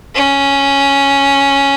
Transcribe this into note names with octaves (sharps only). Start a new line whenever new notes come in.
C#4